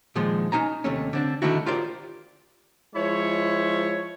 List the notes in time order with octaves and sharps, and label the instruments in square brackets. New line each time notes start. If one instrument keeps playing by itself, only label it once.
[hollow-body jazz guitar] A#2 D#3 F3 G#3 G#4
C#4 D#4 G#5 A#5
D#2 C3 A3 C#4
D3 C4 D4
D3 D#3 A3 D#4 E4 F#4
F4 G4 A#4 C5 D5
[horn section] F3 G#3 E4 C#5